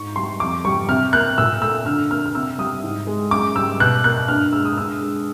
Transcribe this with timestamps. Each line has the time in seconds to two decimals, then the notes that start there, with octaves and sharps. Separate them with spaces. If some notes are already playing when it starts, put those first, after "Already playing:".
Already playing: G#2 C#6
0.16 G3 C6
0.40 F2 D6
0.65 G3 C#6
0.89 C3 F6
1.13 A#3 F#6
1.38 A#2 E6
1.62 A3 E6
1.86 D3 F6
2.10 A#3 F6
2.26 F6
2.35 C3 E6
2.58 G3 D#6
2.83 G#2
3.07 G#3
3.31 F#2 D6
3.56 G3 E6
3.80 B2 F#6
4.04 A#3 F#6
4.28 G2 F6
4.52 G#3 E6
4.65 D#6
4.77 G2 E6
5.01 G#3